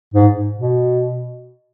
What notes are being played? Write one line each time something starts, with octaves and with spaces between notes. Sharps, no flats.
G#2
B2